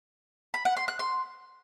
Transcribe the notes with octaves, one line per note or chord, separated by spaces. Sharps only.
B5
F#5
C6
F#6
C6